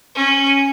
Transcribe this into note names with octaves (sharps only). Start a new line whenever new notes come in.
C#4